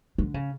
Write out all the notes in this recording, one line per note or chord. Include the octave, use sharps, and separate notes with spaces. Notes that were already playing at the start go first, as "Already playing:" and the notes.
D3
C#3